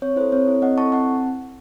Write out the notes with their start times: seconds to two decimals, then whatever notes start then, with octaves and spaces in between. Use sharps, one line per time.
0.02 C4 C#5
0.16 E4 C5
0.20 A4
0.32 C4 C#5
0.47 E4 A4
0.62 C4 D#5 F#5
0.78 E4 A4 A5 C#6
0.92 C4 F#5 A5